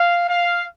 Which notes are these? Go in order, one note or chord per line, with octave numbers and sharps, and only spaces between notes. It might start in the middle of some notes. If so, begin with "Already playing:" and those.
Already playing: F5
F5